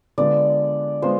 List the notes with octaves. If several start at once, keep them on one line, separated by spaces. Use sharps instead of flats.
D3 G#3 B3 F4 D5
G#3 B3 F4 C5